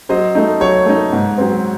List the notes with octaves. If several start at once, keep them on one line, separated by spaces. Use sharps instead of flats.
F#3 C5 D#5
A3 D#4
F#3 C#5
A3 D#4
G#2
F#3 C4